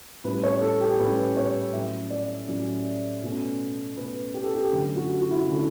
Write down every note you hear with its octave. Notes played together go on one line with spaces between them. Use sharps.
A2 G3 C#4 B4
C#5
A4
G4
A2 G3 C#4 B4
C#5
A2 F#3 C#4 E5
D5
A2 F#3 C#4
B2 A3 C#4
B2 A3 C#4 B4
G4
A4
G4
F#2 D3 A3 C#4
F#4
F#4
E4
D3 A3 C#4 E4